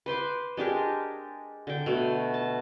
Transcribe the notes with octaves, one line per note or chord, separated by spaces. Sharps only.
B4 C5 C6 D6
G#3 D4 G4 A#4
D3 G5
B2 A3
A5